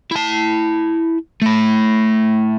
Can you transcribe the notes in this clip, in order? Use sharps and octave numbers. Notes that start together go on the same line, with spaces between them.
E4 A5
A3 E4